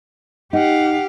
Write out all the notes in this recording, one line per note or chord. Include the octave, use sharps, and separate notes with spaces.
D#4 G4 F5 F#5